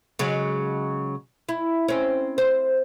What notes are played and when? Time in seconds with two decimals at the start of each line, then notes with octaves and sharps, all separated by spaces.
0.19 C#3 F#3 G#3
1.49 E4
1.88 C4 C#4
2.38 C5